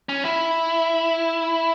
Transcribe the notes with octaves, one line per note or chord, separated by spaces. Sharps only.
C#4
E4